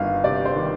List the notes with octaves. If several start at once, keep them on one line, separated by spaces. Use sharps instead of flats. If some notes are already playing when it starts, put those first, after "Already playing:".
Already playing: G1 D#3 F5
C3 D5
C5
D#3